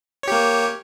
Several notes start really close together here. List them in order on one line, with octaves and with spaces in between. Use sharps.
C#5 G4 A#3